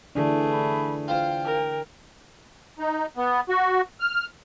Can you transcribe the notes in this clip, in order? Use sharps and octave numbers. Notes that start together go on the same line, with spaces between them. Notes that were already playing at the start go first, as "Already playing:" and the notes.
D3 E3 A3 D4 G#4
B5
F4 C5 G5
A#4
D#4
B3
F#4
F6